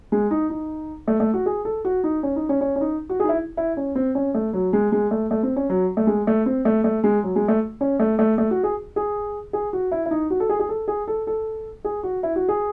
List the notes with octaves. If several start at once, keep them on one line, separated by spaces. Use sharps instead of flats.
G#3
D#4
D#4
A3
A3
F#4
G#4
A4
F#4
D#4
C#4
D#4
C#4
C#4
C#4
D#4
F#4
G#4
D#4
E4
E4
C#4
C4
C#4
A3
F#3
G#3
G#3
A3
A3
C4
C#4
F#3
A3
G#3
A3
C4
A3
A3
G#3
F#3
G#3
A3
C#4
A3
A3
A3
F#4
G#4
G#4
G#4
F#4
E4
E4
D#4
F#4
A4
G#4
G#4
A4
G#4
A4
A4
G#4
F#4
E4
F#4
G#4